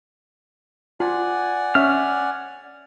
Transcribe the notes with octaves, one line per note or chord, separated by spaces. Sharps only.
F4 D5 F#5 G#5
C#4 C#5 E5 F6